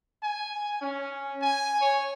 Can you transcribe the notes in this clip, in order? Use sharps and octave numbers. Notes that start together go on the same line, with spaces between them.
G#5
C#4
G#5
C#5